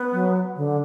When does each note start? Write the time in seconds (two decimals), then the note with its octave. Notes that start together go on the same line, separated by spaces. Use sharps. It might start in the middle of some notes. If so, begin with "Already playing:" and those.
Already playing: B3
0.13 F#3
0.57 D3